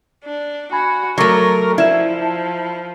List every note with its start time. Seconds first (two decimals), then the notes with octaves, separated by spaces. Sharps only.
0.25 D4
0.72 F#4 G#5 B5 G#6
1.18 F#3 A3 A#4 C#6 D6
1.78 F3 E4 D5 E5 E7
2.22 A5